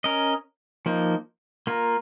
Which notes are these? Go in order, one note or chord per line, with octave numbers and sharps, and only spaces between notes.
C#4 A#4 D#5
F3 A#3 D#4
A#3 F4 A#4